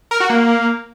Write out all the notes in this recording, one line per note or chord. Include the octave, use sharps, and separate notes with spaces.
A#4
F#4
A#3